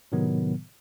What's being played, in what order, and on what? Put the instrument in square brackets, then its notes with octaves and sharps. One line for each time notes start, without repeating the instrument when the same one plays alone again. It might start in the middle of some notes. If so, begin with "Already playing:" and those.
[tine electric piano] A2 C3 D#3 F#3 B3